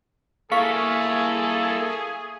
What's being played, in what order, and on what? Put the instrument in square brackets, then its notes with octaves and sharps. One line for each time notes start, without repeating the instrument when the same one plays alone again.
[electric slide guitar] A#3 E4 [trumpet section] G#4 [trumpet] A4 [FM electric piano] F5 C#6 B6